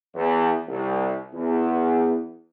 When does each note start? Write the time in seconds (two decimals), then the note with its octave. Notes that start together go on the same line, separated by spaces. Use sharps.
0.15 E2
0.68 C2
1.34 E2